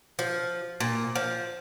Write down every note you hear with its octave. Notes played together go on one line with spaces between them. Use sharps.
F3
A#2
F3